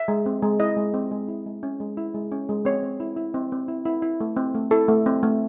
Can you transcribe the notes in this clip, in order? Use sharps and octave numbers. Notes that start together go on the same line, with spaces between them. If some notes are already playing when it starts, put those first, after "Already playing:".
Already playing: E5
G#3
C4
G#3
E4 D#5
G#3
C4
G#3
E4
G#3
C#4
G#3
E4
G#3
C#4
G#3
C4 C#5
C4
E4
E4
C4
C4
E4
E4
E4
A3
C4
A3
E4 A4
A3
C4
A3